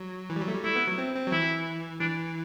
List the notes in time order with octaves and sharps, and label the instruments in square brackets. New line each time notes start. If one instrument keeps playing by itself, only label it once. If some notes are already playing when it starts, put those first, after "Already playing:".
Already playing: [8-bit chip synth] F#3
E3
G3
F#3
A3
G3
[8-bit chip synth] A3 [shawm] E4
[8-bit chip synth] B3
F#3
C4
C4
F#3
[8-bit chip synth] E3 [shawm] E4
[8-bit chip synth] E3 [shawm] D4